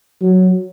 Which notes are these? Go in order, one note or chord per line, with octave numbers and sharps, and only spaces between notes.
F#3